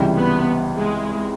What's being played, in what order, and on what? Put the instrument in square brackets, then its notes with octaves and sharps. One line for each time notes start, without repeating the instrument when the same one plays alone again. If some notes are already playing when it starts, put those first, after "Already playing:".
Already playing: [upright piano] C#2 C3 E3 G3
[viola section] B3
G#3